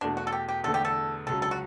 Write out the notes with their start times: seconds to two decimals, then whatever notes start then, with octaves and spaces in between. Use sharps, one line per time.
0.01 E2 B2 A3 D4
0.17 F#4
0.27 A4
0.32 G4
0.48 G4
0.64 E2 D3 A3 A4
0.74 G4
0.85 A4
1.27 C#2 C#3 F#3 A4
1.42 A4
1.51 F#4